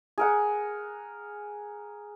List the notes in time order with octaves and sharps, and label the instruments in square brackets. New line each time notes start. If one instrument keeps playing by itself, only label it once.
[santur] G#4 A#4 F#5